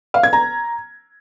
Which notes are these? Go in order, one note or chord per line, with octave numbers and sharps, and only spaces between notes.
F5
G#6
A#5